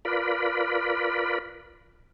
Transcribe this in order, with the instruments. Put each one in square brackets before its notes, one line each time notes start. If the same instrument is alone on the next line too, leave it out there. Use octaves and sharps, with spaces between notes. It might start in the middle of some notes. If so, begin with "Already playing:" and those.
[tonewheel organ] F4 A#4 B4 D5 B5